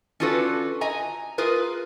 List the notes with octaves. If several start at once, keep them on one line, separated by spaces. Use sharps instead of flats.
C#4 D4 F4 F#4 A4 B4
D#5 G#5 A#5
F4 G#4 A#4 B4